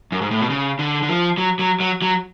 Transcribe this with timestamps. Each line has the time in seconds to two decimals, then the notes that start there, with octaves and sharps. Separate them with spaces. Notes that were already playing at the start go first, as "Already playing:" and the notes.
0.12 F#2
0.22 G#2
0.31 A2
0.40 B2
0.50 C#3
0.79 D3
1.02 D3
1.08 F3
1.38 F#3
1.59 F#3
1.80 F#3
2.02 F#3